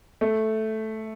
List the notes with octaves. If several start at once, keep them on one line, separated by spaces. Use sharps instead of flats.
A3